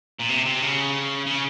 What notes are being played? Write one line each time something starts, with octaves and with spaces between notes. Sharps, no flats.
A#2
C3
C3
C#3
C#3